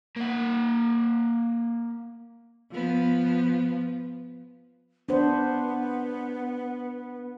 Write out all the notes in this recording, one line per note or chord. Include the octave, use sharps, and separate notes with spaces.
A#3 F#5
F3 B3
B3 D4 C5